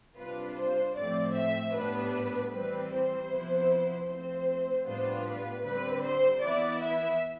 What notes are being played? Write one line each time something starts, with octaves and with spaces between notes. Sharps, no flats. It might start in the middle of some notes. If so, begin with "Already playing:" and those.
C3 G3 D4 F4 B4
C5
A2 F3 A3 C4 D5
E5
A2 G3 B3 D4 B4
E3 G3 C4 B4
C5
C3 F3 B3 E4
F3 A3 C4 C5
A2 G3 B3 D4 F4 C5
B4
D3 G3 C4 B4
C5
E3 B3 E4 D5
E5